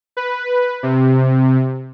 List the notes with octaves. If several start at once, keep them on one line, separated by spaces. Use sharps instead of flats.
B4
C3